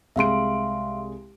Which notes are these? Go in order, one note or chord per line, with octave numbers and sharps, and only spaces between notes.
C2 G#3 E5 F5 C6 D7